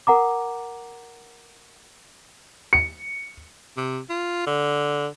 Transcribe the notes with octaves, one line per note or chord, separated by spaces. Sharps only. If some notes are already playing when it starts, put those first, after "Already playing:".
A#4 F#5 A#5 D6
C#7
C3
F4
D3